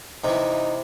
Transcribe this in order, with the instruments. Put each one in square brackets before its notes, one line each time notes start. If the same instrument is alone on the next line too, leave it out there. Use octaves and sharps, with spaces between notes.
[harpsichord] C3 E3 [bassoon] D#4